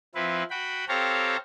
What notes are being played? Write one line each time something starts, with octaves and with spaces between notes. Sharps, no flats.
F3 C4 E4 B4
F#4 G5 B5
C4 G4 A4 C#5 F5 A#5